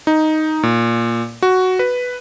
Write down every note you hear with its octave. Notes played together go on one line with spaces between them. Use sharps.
D#4
A#2
F#4
B4